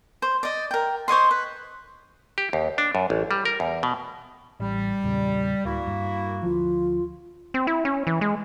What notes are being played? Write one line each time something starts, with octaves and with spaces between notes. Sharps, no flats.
C5
D5 D#5
A#4 G5
C5 C#5 D#5 C6
B4
G4
D#2
D4
F#2
A1
G3
A#4
E2
B2
A1 G3
E2 A#2 C#3
D1 A#3 E4 F#4
G2
D2 F3 F4
C4
E4
C#4
E3
G#3